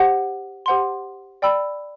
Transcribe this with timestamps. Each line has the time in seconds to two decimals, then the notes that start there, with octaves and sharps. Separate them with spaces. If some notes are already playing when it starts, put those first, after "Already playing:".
Already playing: G4 C5 F#5
0.66 G4 C5 F#5 C6
1.42 D5 G5 B5 E6